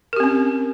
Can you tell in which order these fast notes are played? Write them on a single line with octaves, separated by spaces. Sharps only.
A#4 G4 C4 C#4